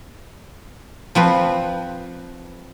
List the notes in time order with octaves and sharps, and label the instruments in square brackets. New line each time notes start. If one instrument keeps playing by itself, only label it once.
[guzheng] F3 C4 B4